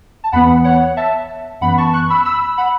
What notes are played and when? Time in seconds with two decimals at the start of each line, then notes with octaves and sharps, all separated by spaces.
0.24 A5
0.32 E2 E3 B3 F#5 B5
0.64 C#5 F#5
0.97 E5 A5
1.61 F#2 E3 B3 F#5 B5
1.78 A5 C#6
1.93 C#6 F#6
2.10 B5 E6
2.25 B5 E6
2.57 F#5 B5